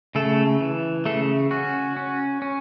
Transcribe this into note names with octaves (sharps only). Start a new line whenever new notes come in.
C#3 A3 A4
E3
C#3 A3 A4
C#4 F#4
C#4
C#4